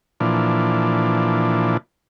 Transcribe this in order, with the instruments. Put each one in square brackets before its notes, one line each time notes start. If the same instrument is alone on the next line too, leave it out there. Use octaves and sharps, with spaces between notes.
[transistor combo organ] A#2 E3 F3 D4